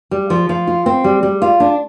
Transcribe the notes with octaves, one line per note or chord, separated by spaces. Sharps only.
G3
F3
F3
F4
C4
G3
G3
F4
D4